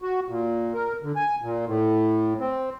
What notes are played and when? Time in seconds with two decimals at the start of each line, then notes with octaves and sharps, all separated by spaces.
0.02 F#4
0.29 A#2
0.74 A#4
1.03 D3
1.16 G#5
1.42 A#2
1.66 A2
2.40 C4